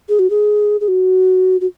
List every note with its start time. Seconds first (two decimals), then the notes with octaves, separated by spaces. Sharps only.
0.09 G#4
0.19 F#4
0.30 G#4
0.81 G#4
0.88 F#4
1.61 F#4